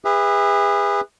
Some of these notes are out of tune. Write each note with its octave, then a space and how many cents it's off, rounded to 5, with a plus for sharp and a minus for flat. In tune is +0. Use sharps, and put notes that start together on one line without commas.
G#4 -35 B4 +0 E5 -15